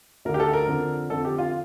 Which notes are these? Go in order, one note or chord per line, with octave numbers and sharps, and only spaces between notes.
D2 D3 A#4
G4
A4
A#4
F2 D3
F2 D3 A4
G4
F4